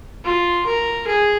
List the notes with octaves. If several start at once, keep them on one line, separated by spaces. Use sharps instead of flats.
F4
A#4
G#4